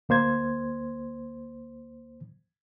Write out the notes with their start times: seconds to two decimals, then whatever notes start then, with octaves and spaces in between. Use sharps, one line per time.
0.09 D2 A#3 C5 G#6